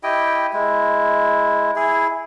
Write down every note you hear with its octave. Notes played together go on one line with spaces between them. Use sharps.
E4 G4 D#5 G5
G#3 E4
E4 G#4